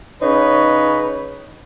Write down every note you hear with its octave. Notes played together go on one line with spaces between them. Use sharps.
C#3 D#4 B4 C#5